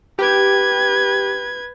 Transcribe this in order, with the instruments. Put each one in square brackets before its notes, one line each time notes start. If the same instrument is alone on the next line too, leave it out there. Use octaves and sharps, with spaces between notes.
[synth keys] G4 [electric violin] B4 G#6